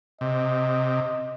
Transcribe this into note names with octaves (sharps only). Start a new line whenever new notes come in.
C3 D#5